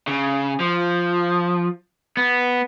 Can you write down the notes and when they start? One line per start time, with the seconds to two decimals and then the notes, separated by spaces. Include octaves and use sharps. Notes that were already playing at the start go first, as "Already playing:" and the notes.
0.07 C#3
0.60 F3
2.17 B3